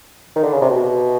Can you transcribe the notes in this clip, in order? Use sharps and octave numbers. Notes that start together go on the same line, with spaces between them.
D#3
D3
C#3
C3
B2